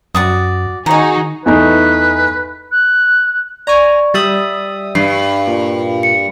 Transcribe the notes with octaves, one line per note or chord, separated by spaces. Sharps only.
F#2 F#4 D5 D#6
D#3 D#4 F#4 G#4 G#5 A#5
E2 A3 D#4 B4
F#6
D5 G#5 A#5 C#6
G3 E5 D#6 A6 F#7
G2 C7
A#2
C#7